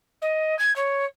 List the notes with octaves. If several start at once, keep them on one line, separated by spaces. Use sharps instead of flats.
D#5
G#6
C#5